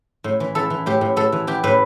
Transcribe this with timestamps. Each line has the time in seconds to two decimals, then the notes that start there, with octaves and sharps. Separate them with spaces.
0.24 A2
0.40 E3
0.55 E3 A4
0.70 E3
0.86 A2 G4
1.01 A2
1.16 A2 A4
1.32 E3
1.47 E3 G4
1.64 A2 B4